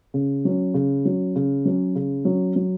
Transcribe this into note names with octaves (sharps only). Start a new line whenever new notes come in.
C#3
F#3 C#4
C#3
F#3 C#4
C#3
F#3 C#4
C#3
F#3 C#4
F#3